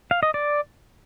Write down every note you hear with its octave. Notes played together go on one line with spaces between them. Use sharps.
F5
D#5
D5